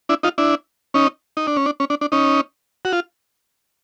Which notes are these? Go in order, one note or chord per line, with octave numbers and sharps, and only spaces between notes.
D4 E4
D#4 F4
D4 E4
C#4 D#4
D#4
D4
C#4
D4
C#4
D4
D4
C#4 D#4
F#4
F4